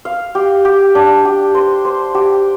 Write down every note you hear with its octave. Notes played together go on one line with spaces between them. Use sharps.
F5
G4
G4
D4
G4
C5
C5
G4